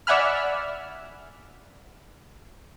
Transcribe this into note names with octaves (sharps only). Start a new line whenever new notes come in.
D5 E5 F#5 G#5 B5 F6